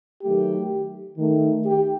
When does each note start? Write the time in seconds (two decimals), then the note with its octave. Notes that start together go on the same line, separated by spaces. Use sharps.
0.23 D#3 F#3 A3 G4
1.17 D#3 A3
1.66 G4